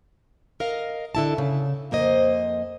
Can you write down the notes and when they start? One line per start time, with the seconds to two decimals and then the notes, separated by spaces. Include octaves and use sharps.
0.60 A#4 D#5 F5
1.15 D3 E4 A5
1.38 C#3
1.91 F2 A#3 C5 D#5